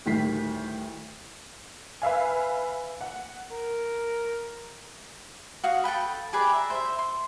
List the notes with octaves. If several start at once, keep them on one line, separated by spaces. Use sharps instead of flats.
D2 A2 D#3 G3 B6 C7
B4 E5 F5 G#5
F#5
A#4
F#4 F5 D#6
A4 B4 G5 B5
G4 G#4 B4 D5
E5 A#5
C5 E5
C6